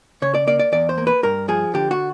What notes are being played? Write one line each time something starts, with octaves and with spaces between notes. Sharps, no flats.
C#3 C#5
D5
A#3 D5
D5
E2 D5
C5
A#3
B4
G2 A#4
F3 G#4
D3 G4
F#4